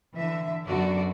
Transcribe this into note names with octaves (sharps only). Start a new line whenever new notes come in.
D3 E3 E5
F#2 D3 B3 F#4 D5